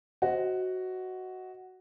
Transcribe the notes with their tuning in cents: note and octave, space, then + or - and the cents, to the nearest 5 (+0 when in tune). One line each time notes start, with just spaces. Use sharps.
F#4 +5 C5 +0 D#5 +20